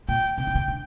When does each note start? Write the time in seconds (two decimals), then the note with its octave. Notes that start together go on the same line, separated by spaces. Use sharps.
0.09 A#2 G5
0.38 C3 G5
0.47 D3
0.55 C3
0.68 D3